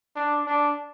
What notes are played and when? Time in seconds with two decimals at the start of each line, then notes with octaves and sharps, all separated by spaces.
0.16 D4
0.46 D4